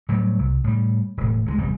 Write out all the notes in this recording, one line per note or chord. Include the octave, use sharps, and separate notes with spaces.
A2 F#3 G3
C2
A2 G3
E1 A2
D2 F#3 G#3
G1 E2 C3 G3